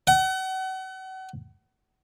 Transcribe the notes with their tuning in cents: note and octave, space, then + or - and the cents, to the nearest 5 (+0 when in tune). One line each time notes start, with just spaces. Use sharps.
F#5 +35